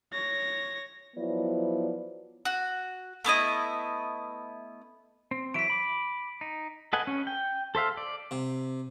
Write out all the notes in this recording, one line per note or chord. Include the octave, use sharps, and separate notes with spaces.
C#5 A#6
F3 F#3 B3 E4 D5
F#4
A3 B3 E4 D#5
C4
E3 F#3 E5 B6 D7
B5 D6
D#4
A4 B4 D#5 F#5 G#5
C#4
G5
A4 C5 E5 F5
D5
C3